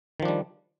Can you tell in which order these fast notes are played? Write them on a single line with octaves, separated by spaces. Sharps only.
D#3 F3 D4 G3